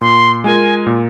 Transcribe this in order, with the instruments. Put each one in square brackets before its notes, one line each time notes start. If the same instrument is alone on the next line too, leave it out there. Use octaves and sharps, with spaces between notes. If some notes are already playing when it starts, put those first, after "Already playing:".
[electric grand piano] A#2 [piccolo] C6
[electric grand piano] G#3 F4 A#4 [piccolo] G#5
[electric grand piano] A#2